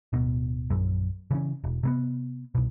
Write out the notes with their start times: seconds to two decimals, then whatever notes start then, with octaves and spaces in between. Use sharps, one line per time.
0.13 D1 B2
0.70 A#1 F#2
1.31 C#3 E3 C#4
1.64 E1
1.83 C3 A#3 B3
2.55 C2 B2